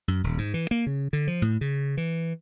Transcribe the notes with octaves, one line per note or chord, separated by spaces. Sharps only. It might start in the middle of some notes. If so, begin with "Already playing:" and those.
F#2
D#1
G#2
E3
A#3
C#3
D3
F3
A2
C#3
E3